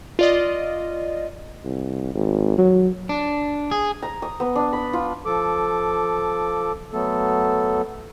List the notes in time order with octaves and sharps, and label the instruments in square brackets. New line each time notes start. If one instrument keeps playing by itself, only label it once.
[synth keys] F4 D5 D#5
[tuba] C2
G#1
F#3
[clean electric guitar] D4
G#4
[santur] A#5
D#6
B3
D4
B5
F4
[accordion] F3 A4 D6
F#3 A3 B3 A4